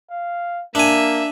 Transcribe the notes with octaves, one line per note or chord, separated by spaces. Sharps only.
F5
A#3 D4 E5 G#5